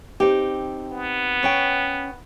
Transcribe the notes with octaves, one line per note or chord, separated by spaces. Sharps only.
C4 D#4 G4
B3
C#4 C#5 G5